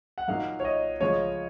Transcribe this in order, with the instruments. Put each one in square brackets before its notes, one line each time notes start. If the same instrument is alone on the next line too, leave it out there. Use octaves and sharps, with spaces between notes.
[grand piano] F#5
[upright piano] A#2 F#3 A#3 D#4 F#4 [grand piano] F5
[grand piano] C#5
D#5
[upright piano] C#3 F3 G#3 [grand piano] C#5